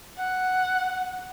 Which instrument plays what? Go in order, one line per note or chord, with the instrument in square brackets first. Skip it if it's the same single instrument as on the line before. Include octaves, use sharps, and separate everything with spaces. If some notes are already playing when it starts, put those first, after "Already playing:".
[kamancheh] F#5